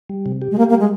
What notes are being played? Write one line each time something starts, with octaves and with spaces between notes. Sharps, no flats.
G3
C3
G4
G#3
A#3 G4
A#3
G3
G#3